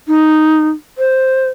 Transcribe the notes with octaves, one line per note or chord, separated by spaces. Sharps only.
D#4
C5